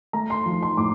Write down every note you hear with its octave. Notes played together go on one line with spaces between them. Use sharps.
A3 A#5
C6
F3
C6
A2 D6